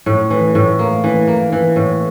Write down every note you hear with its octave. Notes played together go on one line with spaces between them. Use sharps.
A2
E3
A2
A#3
E3
A#3
E3
A2